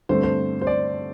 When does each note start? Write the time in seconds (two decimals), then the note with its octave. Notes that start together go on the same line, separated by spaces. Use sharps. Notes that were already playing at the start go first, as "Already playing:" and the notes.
0.09 G2 D3 A3 C4 C5
0.23 C5
0.61 C5
0.67 D5